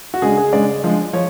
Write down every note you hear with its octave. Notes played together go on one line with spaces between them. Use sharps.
F#4
C#3 G#3 D4 G#4
G#4
C#3 G#3 D4 D5
F3 G#3 D4
F3 C#5